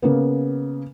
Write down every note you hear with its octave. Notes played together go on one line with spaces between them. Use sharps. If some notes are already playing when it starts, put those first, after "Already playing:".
C#3 A#3 B3